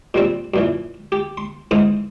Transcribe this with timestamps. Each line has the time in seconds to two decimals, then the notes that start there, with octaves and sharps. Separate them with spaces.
0.14 A#2 G3 C4
0.54 F#2 A#2 E3
1.12 G4
1.37 C6
1.71 G#2 E3 C5 F5 D#6